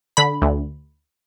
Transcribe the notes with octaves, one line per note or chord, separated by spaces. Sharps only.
D3 B5
D2